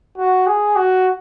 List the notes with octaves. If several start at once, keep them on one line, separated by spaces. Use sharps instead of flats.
F#4
G#4
F#4